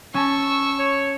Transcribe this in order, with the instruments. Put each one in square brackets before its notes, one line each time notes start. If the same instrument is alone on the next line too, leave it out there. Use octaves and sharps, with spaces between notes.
[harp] C#4 A5 [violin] C#6 E6
[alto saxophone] C#5